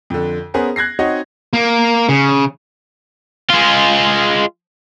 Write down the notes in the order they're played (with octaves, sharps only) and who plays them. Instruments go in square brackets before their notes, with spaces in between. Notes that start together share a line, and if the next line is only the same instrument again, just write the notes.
[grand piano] F2 D3
B3 C#4 G#4 A#4 C5 G#5
F#6 G#6 A#6 C7
C4 D#4 F#4 C#5 D#5 F#5
[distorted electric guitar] A#3
C#3
[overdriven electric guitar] G#3 F4